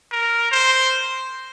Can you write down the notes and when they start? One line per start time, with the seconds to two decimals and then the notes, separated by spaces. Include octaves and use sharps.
0.12 A#4
0.52 C5